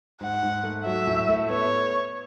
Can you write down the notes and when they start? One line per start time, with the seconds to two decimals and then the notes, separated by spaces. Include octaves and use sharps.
0.21 G#2 F#5
0.43 G#2
0.63 A3
0.86 F#3 E5
1.07 A2
1.29 A3
1.50 B3 C#5